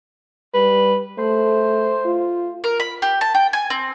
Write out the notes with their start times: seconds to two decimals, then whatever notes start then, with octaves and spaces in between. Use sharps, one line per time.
0.54 G3 B4
1.18 A3 C5
2.05 F4
2.64 A#4
2.80 B5
3.02 G4
3.21 A5
3.34 G5
3.53 G#5
3.70 C4